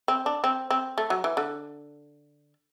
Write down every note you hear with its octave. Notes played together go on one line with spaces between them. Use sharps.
C4
D4
C4
C4
A3
F#3
E3
D3